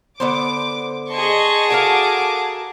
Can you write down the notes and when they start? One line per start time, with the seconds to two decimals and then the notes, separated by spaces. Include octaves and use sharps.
0.20 D3 B3 C5 D6
1.11 G#4 D#5 A5 C6 C#6
1.70 F#4 A4 A#4 F5 F#5 D6